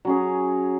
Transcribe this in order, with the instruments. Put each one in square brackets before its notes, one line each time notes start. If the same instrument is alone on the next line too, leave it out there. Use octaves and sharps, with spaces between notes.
[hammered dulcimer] F#3 C#4 G#4